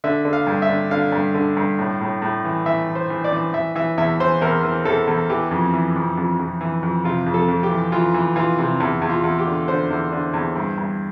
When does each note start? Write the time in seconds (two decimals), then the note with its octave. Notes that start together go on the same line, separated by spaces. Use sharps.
0.04 D3 E5
0.25 D3
0.33 F5
0.47 G2
0.62 E5
0.69 D3
0.91 D3 F5
1.12 G2
1.34 D3
1.57 G2
1.79 A2
2.01 A2
2.22 A2
2.45 E3
2.66 E3 E5
2.89 E3
2.95 C5
3.10 E3
3.24 D5
3.32 E3
3.54 E3 E5
3.75 E3 E5
3.98 E2 E5
4.20 E3 C5
4.41 E2 A#4
4.63 E3
4.85 E2 A4
5.07 E2
5.30 E3 G4
5.51 F2
5.73 E3
5.95 F2
6.17 F2
6.39 F2
6.61 E3
6.83 F2
7.04 C3 F4
7.26 F2
7.34 A4
7.48 F2
7.63 G4
7.70 E3
7.92 E3 F4
8.14 E3
8.36 E3 F4
8.58 C3
8.80 E2
9.02 E2
9.09 F4
9.24 E2
9.39 G4
9.46 D3
9.68 D3 C5
9.90 E2
10.12 D3
10.34 E2
10.56 G2
10.78 G2